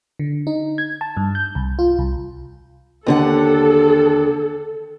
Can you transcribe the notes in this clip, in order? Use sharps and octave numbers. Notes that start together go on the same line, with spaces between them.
D3
D#4
G#6
A5
G2
G6
C2
F4
C2
D#2 D3 A4 F#5